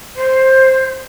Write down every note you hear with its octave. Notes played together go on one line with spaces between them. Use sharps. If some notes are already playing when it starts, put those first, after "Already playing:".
C5